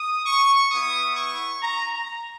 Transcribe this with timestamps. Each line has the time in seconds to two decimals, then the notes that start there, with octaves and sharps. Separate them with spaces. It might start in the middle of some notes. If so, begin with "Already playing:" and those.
Already playing: D#6
0.26 C#6
0.72 B3 E4 D#6
1.17 C#6
1.61 A#5
1.92 A#5